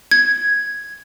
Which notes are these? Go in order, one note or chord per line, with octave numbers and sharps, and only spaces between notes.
G#6